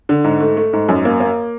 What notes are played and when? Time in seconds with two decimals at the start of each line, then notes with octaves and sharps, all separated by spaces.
0.09 D3
0.24 G#2
0.40 A3
0.57 A3
0.73 G#2
0.89 F#2
1.05 A#3
1.20 A#3